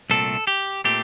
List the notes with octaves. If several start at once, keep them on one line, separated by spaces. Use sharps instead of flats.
C2 A#2 A3 C4 A4
G4
A#2 A3 C4 G4